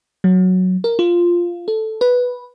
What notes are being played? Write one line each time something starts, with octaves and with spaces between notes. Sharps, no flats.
F#3
A#4
F4
A4
B4